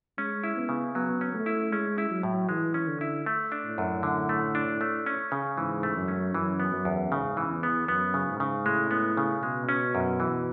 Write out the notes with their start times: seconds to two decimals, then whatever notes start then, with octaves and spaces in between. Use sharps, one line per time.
0.18 G#3 C#4
0.44 E4
0.57 B3
0.69 C#3
0.95 F#3 B3
1.21 C#4
1.34 A3
1.46 E4
1.72 G#3 C#4
1.98 E4
2.10 F#3
2.23 A2
2.49 E3 G#3
2.74 C#4
2.88 D3
3.01 E4
3.26 A3
3.52 D4
3.65 A2
3.78 F#2
4.03 D3
4.29 A3
4.55 D4
4.81 A3
5.06 C#4
5.32 C#3
5.57 G#2 E3
5.83 A3
5.96 F#2
6.08 C#4
6.34 F#2 E3
6.60 B3
6.73 F#2
6.85 E2
7.11 G#2 C#3
7.37 E3
7.50 E2
7.63 B3
7.88 F#2 B3
8.14 C#3
8.27 G#2
8.40 C#3
8.65 A2 G#3
8.91 B3
9.17 C#3
9.42 B2 G#3
9.69 C#4
9.95 F#2
10.20 E3